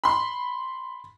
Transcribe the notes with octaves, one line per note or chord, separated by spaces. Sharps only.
B5 C6